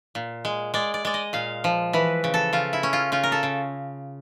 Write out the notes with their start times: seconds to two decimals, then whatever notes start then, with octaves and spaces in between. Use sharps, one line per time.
0.15 A#2
0.45 G#3
0.74 G#3 D5
0.94 D5
1.05 G#3 D5
1.14 D#5
1.33 A#2 F5
1.64 F3
1.93 E3 B4
2.24 C#3
2.34 A4
2.53 C#3 F4
2.73 E4
2.83 C#4
2.93 F4
3.12 C#3 F4
3.23 A#4
3.32 A4
3.43 C#3